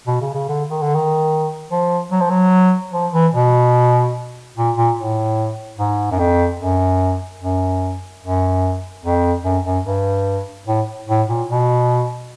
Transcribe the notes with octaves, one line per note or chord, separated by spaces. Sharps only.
B2
C#3
C#3
D3
D#3
D3
D#3
F3
F#3
F3
F#3
F3
E3
B2
A#2
A#2
A2
G#2
F#2
F2
F#2
F#2
F#2
F2
F#2
F#2
G2
A2
A2
A#2
B2